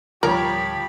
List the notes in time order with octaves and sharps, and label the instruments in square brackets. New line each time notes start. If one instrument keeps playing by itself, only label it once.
[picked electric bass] D1 D3 G3 [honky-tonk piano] F3 C#5 [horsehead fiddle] G4 B5 [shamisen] A#4